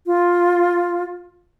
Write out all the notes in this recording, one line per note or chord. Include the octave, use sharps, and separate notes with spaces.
F4